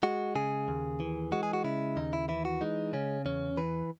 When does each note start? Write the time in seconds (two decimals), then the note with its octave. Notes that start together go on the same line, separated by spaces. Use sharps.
0.03 G#3 F#4
0.35 C#3 G#4
0.68 D#2
1.00 E3
1.32 G#3 F#4
1.43 G#4
1.53 F#4
1.64 C#3 E4
1.96 D#2 D#4
2.13 E4
2.29 E3 E4
2.45 F#4
2.61 G#3 D#4
2.93 C#3 C#4
3.26 E2 C#4
3.57 E3 B4